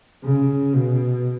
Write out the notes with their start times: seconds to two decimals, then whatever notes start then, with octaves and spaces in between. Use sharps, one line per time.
0.24 C#3
0.74 B2